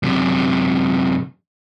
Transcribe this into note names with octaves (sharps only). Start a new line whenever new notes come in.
F#2 C3